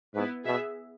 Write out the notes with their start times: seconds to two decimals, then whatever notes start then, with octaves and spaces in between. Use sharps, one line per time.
0.14 G#2 B3 E4 B4
0.44 B2 B3 G#4 E5